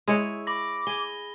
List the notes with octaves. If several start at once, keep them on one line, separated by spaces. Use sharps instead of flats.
G#3 E4 G#4 C#5
B5 D6 A#6
G#4 G7